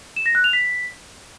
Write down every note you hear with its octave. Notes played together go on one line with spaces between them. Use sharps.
E7
A#6
F#6
F7
B6